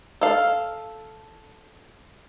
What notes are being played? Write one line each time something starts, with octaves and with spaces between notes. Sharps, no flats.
A4 F5